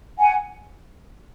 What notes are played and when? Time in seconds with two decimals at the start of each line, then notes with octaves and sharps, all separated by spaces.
0.18 F#5 G#5